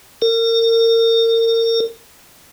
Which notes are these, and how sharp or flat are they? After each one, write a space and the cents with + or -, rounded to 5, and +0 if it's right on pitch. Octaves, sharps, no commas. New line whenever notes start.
A#4 -35